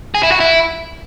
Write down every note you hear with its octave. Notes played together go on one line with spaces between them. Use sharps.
G#4
E4
F#4
E4